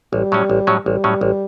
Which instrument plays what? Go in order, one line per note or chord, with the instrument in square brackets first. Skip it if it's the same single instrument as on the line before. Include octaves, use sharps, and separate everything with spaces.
[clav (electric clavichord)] A1 [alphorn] G3
[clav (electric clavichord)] A2 F#3 C#4
A1
A2 F#3 C#4
[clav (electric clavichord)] A1 [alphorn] G3
[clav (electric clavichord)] A2 F#3 C#4
A1